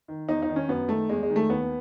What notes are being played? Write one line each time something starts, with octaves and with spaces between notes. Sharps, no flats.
D#3
E2 D#4
D#4
D#3
C#4
F#2 B3
D#3 A3
E2 G#3
G#3
D#3
A3
D#2 B3